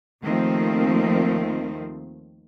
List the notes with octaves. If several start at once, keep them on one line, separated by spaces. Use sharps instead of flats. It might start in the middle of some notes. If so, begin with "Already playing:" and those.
D#2 D#3 F3 A3 C4